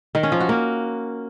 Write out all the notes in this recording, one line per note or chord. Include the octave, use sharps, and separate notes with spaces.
D#3
C#4
F3
F#4
A#3